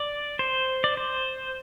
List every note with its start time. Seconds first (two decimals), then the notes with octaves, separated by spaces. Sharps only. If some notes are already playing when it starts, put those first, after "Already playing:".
Already playing: D5
0.39 C5
0.84 D5
0.97 C5